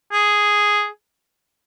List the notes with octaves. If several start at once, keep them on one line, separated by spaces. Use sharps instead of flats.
G#4